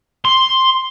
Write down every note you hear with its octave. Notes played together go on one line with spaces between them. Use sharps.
C6